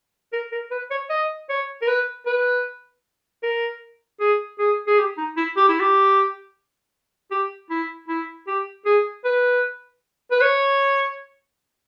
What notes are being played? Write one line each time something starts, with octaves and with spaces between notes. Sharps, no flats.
A#4
A#4
B4
C#5
D#5
C#5
A#4
B4
B4
A#4
G#4
G#4
G#4
G4
D#4
E4
G4
E4
G4
G4
E4
E4
G4
G#4
B4
B4
C#5